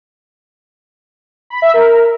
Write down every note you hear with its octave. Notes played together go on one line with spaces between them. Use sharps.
B5
E5
A#4